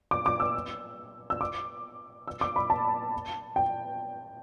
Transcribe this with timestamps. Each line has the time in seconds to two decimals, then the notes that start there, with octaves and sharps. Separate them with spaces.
0.11 D6
0.26 D6
0.40 E6
1.30 E6
1.41 D6
2.28 E6
2.41 D6
2.56 B5
2.70 A5
3.56 G5